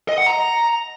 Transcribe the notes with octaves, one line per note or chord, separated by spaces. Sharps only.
D#5
F#5
A#5